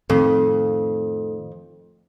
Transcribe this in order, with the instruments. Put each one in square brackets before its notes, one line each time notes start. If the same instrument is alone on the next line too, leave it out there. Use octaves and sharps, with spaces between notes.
[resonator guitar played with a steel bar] F2 [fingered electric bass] A2 D#3 [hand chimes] A4